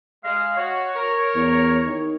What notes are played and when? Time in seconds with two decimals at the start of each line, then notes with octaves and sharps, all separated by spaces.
0.24 G#3 F5
0.57 F#4 C#5
0.95 A#4
1.35 E2
1.87 D#3